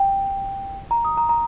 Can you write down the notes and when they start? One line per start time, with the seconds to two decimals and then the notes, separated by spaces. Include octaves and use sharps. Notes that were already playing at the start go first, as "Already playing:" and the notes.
Already playing: G5
0.91 A#5
1.05 D#6
1.17 A#5
1.29 A#5